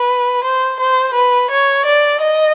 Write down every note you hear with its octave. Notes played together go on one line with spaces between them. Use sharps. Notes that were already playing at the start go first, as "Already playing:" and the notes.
Already playing: B4
C5
C5
B4
C#5
D5
D#5